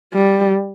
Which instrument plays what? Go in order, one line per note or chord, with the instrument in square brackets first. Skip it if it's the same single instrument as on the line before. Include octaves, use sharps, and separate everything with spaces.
[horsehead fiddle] G3